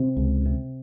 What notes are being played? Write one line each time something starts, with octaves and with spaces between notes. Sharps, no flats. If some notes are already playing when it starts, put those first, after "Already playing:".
Already playing: C3 C4
C#2
C3